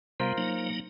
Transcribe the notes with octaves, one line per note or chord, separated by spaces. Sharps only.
C3 G3 B3 F4 A#4 C5
F#3 A#3 D#4